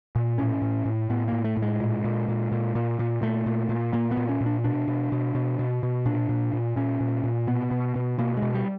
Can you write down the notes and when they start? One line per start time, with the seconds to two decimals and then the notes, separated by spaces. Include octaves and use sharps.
0.16 A#2
0.38 A2 C#4
0.62 A2
0.85 A2
1.10 A2 B3
1.28 A2 A#3
1.44 A3
1.57 A2
1.62 G#3
1.80 A#2
2.04 A#2
2.28 A#2
2.52 A#2
2.75 A#2
2.99 A#2
3.22 A#2 A3
3.46 A#2
3.69 A#2
3.93 A#2 A#3
4.11 B3
4.17 A#2
4.29 C#4
4.41 A#2
4.46 D4
4.64 B2 D4
4.88 B2
5.12 B2
5.35 B2
5.59 B2
5.83 B2
6.06 A#2 D4
6.29 A#2
6.53 A#2
6.76 A#2 C#4
7.00 A#2
7.24 A#2
7.47 B2 B3
7.71 B2
7.96 B2
8.18 B2 A#3
8.37 G#3
8.42 B2
8.54 G3